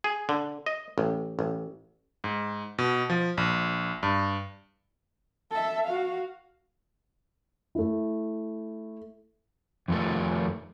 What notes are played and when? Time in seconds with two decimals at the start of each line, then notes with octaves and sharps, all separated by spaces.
0.04 G#4
0.29 D3
0.66 D#5
0.98 A1
1.39 A1
2.24 G#2
2.78 B2
3.10 F3
3.37 A#1
4.03 G2
5.51 A4 E5
5.86 F#4 F5
7.75 A3 E4
9.88 F2 D#3 F3 A3